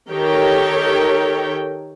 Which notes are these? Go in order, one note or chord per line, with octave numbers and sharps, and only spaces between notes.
D#3 G4 A4 A#4 C#5 G5